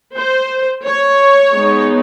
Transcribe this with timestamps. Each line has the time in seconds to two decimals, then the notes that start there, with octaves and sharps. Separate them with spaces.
0.14 C5
0.84 C#5
1.53 G#3 B3 D#4